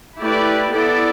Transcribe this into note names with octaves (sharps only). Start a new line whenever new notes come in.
A3 E4 G4 B4 D5
B3 E4 A4 D5